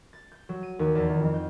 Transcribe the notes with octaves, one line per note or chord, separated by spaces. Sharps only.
A6
G6
F#3
D#7
D#2
E2
D#3
F2
G6